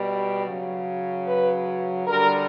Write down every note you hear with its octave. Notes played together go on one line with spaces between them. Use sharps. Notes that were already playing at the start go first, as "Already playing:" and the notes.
Already playing: B2 G3
C#3 F#3
B4
D3 G3 A#4